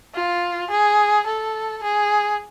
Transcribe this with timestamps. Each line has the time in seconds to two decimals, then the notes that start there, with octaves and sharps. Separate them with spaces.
0.14 F4
0.70 G#4
1.26 A4
1.83 G#4